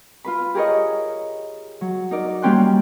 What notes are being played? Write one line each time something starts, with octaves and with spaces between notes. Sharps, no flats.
F4 B4 B5
G4 G#4 A#4 C#5 D#5
F#3
D#4 A#4 D5
G3 A#3 C#4 G5 C6 F#6